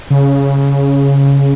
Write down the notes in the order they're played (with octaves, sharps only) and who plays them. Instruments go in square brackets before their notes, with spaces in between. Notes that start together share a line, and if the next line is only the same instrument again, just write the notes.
[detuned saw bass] C#3